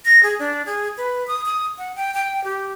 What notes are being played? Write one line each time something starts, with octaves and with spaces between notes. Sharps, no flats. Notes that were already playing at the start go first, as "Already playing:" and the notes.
A#6
G#4
D4
G#4
B4
D#6
D#6
F#5
G5
G5
G4